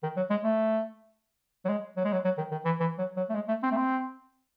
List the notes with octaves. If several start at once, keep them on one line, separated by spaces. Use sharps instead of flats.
D#3
F#3
G#3
A3
F#3
G#3
F#3
G#3
F#3
F#3
D#3
D#3
E3
E3
F#3
F#3
A3
G#3
A3
C4
A3
C4